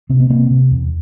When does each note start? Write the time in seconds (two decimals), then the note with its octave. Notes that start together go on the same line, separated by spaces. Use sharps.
0.09 C3 C4
0.20 B3
0.30 C3 A#3 C4
0.50 C3
0.71 E2